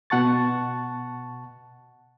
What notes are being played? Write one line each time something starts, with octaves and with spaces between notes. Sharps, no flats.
B2 F#5 A5 C#6 A6